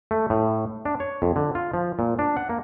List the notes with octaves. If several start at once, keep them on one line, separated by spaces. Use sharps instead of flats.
A3
A2
D4
C#5
F2
D3
F4
F3
A#2
D4
F#5
A#3